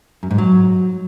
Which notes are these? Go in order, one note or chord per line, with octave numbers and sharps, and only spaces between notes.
F#2
G#2
F#3